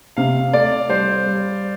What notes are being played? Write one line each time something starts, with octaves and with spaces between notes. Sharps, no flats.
C3 F5
A3 D5
G3 C5
G3